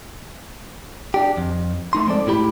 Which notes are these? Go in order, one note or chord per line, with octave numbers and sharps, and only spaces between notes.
D4 G4
F2
A3 D#4 C6
F3 G#3 C4 A4 D5
A2 E4 G4 B5